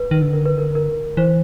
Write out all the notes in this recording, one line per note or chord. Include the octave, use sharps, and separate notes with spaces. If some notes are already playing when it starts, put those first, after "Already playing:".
Already playing: B4
D#3
D3
A#4
B4
A#4
A#4
E3 C5